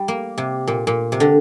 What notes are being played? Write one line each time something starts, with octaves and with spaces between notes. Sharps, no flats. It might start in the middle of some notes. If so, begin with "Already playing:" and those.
Already playing: G3
A#3
C3
A#2
A#2
C3
D3